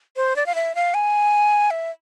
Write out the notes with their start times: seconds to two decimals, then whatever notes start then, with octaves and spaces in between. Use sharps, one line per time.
0.16 C5
0.36 D5
0.46 F5
0.55 E5
0.75 F5
0.94 G#5
1.70 E5